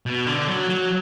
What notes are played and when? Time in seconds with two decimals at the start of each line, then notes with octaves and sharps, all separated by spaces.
0.06 B2
0.27 D3
0.48 F#3
0.69 F#3